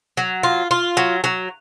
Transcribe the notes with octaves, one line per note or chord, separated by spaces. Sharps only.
F#3
F4
F4
F#3
F#3